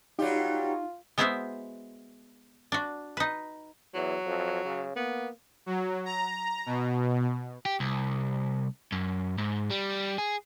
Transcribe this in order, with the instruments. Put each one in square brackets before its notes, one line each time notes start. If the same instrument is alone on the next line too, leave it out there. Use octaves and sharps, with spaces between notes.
[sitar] F#3 G3 G4 [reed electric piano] D#4 [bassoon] F4
[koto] G#3 B3 E4 F#4 C5 E5
D4 F#4
D#4 B4
[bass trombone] E2 [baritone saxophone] F#3
[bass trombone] F2
C#3
[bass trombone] A#3 [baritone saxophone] B3
[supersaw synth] F#3
A#5
B2
[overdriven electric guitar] G4
C2
F#2
G#2
G3
G#4